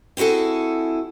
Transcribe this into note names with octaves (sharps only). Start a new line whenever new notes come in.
C4 E4 F#4 G#4 A4